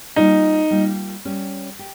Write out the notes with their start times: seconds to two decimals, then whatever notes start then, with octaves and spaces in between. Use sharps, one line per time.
0.16 G3 A#3 D#4 F4
0.71 G3 A#3 F4
1.25 G3 C#4 G4
1.79 G4